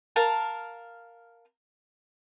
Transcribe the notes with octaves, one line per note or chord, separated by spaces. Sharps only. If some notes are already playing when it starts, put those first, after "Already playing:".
A#4 F5 A5